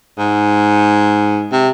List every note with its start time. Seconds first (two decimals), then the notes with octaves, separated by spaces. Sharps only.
0.19 G#2
1.52 C3